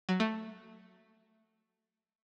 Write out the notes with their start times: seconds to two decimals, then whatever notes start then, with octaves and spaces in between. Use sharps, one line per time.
0.09 F#3
0.20 A3